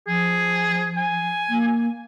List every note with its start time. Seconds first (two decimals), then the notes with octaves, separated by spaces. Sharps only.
0.07 F3 G#4
0.97 G#5
1.49 A#3